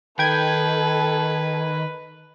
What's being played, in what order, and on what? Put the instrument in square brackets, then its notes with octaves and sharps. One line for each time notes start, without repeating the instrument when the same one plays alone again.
[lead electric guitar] D#3 [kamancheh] A4 [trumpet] B4 [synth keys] G5 G#6